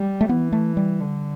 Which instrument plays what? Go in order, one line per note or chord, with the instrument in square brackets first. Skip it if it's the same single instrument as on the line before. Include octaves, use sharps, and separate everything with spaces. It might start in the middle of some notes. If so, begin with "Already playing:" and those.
Already playing: [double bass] G3
[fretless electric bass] A3
[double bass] E3 [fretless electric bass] B3
[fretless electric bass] A3
G3
[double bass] D3